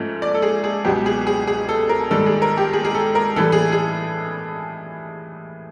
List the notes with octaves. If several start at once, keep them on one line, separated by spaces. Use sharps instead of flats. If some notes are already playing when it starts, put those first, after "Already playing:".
Already playing: G#2 F3 A3 C#4
D5
A4
G#4
G#4
C#2 B2 F#3 B3 G4
G#4
G#4
G#4
A4
A#4
G#2 D#3 G3 A4
G#4
A#4
G4
G#4
G#4
A4
A#4
A2 E3 G3 A4
G#4
G#4